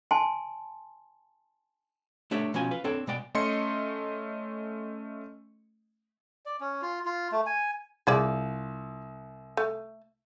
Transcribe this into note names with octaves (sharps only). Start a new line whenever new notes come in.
G#5 A5 C6
A3 D4 G4 C#5 E5
B2 F3 C#4 G#5
F4 B4 F5
C4 D4 A4 C#5 G5
B2 G#3 D5 G5
A3 C#4 D#5 C6 C#7
D5
C#4
F4
F4
A3
G#5
C2 F3 G#4 D5
A3